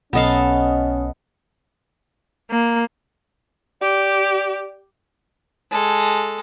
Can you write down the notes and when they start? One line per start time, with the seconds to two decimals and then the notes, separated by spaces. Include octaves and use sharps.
0.13 B1 B3 C#4 A4 D#5 F5
2.51 A#3
3.82 G4 D5
5.72 G#3 A4